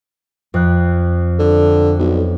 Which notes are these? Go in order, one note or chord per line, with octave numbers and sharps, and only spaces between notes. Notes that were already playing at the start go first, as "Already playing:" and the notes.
F2 F#6
D3
B1